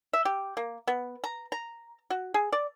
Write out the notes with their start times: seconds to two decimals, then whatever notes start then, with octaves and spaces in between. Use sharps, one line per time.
0.13 E5
0.25 G4
0.57 A#3
0.87 B3
1.24 A#5
1.52 A#5
2.10 F#4
2.34 G#4
2.52 D5